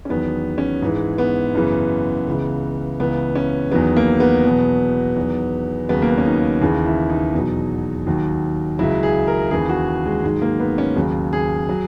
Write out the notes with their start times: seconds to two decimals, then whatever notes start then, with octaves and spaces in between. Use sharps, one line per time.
0.05 C#4
0.09 E2 D#3 F#3 B3
0.58 C#4
0.82 G#2 E3
1.18 B3
1.55 F#2 C#3 E3
2.27 C#2 C#3 E3
3.00 C#2 C#3 E3 B3
3.35 C#4
3.71 E2 D#3 F#3 B3
3.97 A#3
4.20 B3
4.44 E2 B2 F#3
5.17 E2 D#3 F#3
5.89 D#2 C#3 F#3 B3
6.02 A#3
6.10 B3
6.18 C#4
6.26 D#4
6.62 D#2 C#3 E3
6.86 E4
7.09 D#4
7.34 E2 B2 F#3
8.06 D#2 D#3 F#3
8.79 C#2 C#3 F#3 E4
9.03 G#4
9.27 A#4
9.51 D#2 C#3 E3 G#4
9.69 F#4
10.06 G#3
10.24 G#2 D#3 F#3 G#3
10.42 A#3
10.60 B3
10.78 C#4
10.96 D#2 C#3 F#3
11.33 G#4
11.69 F#3